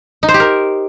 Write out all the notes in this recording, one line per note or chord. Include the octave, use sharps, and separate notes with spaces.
D#4
C5
G4
A#4